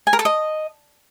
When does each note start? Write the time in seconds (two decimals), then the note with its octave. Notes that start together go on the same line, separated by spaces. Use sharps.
0.07 G#5
0.13 A#4
0.19 A4
0.25 D#5